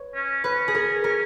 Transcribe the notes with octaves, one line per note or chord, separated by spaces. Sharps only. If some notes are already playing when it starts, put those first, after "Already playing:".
Already playing: B4 C#5
C#4
C#4 B4
G#4
A#4
A#4